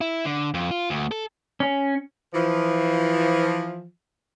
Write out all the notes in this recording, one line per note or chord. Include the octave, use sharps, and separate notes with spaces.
E4
D3
F2
F4
D2
A4
C#4
E3 F3